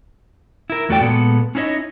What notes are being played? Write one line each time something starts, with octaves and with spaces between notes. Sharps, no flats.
E4 A#4
E2 A3 F#4 A4 D5 G5
A#2 G#3 B3 A4
C#4 D#4 E4 C#5 D#5